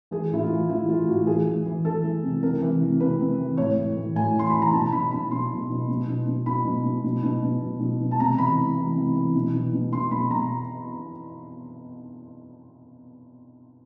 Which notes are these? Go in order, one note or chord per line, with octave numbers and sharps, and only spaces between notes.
E3 G#4
A2 E4
F4
E3
E3 E4
E3 F4
A2 F#4
E3 G#4
E3
E3
E3 A4
E3
C3
C3 A#4
E3
C3
C3 B4
C3
E3
A2 C#5
A2
E3
A2 G#5
E3 C6
E3 B5
A#5
B2 A5
B2 B5
B2 B5
B2 C6
B2
B2
B2
B2
B2
B2 B5
B2
B2
B2
B2
B2
B2
B2
B2
A5
C3 A#5
E3 B5
E3
E3
C3
E3
B2
B2
B2
B2 C6
B2 B5
B2 A#5